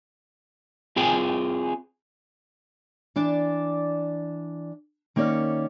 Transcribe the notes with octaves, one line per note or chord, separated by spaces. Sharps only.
C4 F4 G#4 G5 G#5
E3 D4 D5
D#3 A#3 C#4 C#5 D5